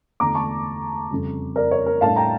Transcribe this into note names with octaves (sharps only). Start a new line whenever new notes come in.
E2 D3 A3 D4 A#5 D6
A5 C#6
F2 C#3 G3
A#4 D5
C#5
A#4
A2 G3 D4 F5 A5
G5 A#5